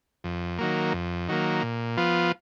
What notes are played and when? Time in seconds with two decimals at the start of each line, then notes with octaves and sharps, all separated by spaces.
0.24 F2
0.58 D#3 F#3 A#3
0.93 F2
1.28 D#3 F#3 A#3
1.62 A#2
1.97 F3 B3 F4